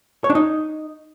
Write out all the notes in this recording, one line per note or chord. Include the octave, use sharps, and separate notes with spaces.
C#5
D4
D#4